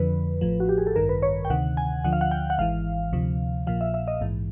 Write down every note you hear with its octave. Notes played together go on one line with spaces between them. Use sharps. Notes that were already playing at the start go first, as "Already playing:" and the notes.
Already playing: F2 D3 F3 B4
A1 A2 F3
F#4
G4
G#4
A4
A1 G2 D#3 A#4
B4
C#5
G5
D2 C3 D#3 F#5
G#5
D2 D3 F3 F#5
F5
F#5
G5
F#5
G#1 G#2 E3 F5
D2 C3 F3
A#1 A#2 F3 F5
E5
E5
D#5
A#1 G#2 E3